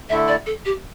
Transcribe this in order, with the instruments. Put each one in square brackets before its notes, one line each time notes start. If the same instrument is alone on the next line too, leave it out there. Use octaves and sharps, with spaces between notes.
[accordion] D3 A3 E4 A4 [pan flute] E5
[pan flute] D5
A4
G4